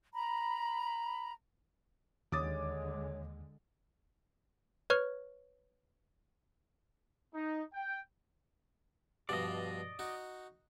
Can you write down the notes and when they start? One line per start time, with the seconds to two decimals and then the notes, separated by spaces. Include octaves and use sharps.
0.14 A#5 B5
2.32 D#2 D3 G#3 C#5 D6 D#6 A6
4.90 B4 C#5 C#6 F6
7.34 D#4
7.74 G5
9.29 G2 B2 F3 D5 D#5
9.99 D#4 F#4